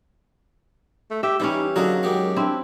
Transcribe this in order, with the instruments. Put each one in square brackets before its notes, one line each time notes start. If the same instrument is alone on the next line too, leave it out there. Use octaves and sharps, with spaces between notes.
[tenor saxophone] A3
[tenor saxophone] G4 [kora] E5
[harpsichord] E3 [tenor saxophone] G3 [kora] C#4 E4 G4 [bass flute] D#4
[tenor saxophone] D3 [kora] F#3 [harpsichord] A#3 D#4 G#4 [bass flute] C#4
[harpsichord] F#2 D#3 G#3 [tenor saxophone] G4
[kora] C4 E4 [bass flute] D4